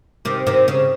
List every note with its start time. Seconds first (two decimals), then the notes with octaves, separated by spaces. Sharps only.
0.25 C3 D#3
0.47 C3 D#3
0.68 C#3